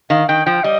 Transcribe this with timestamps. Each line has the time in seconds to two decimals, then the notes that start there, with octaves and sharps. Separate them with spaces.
0.10 D#3 F5
0.29 D#3 G5
0.46 F3 G5
0.64 G3 D#5